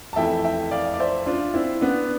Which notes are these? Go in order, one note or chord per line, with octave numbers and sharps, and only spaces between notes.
A5
F2 E3 A3 E5 G5
E5 G5
D5 F5
D5
C5 E5
D4 F4
C4 E4
B3 D4